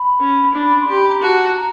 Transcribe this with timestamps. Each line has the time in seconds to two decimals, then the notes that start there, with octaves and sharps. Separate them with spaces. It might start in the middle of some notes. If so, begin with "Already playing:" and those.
Already playing: B5
0.20 C#4
0.54 D4
0.80 C6
0.88 G4
0.94 B5
1.08 A#5
1.22 F#4 A5
1.56 A#5